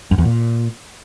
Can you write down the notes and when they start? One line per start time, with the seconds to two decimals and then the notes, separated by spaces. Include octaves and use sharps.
0.11 F#2
0.18 E2
0.25 A#2